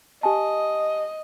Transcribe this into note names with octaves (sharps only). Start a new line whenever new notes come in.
G4 D#5 G#5 A5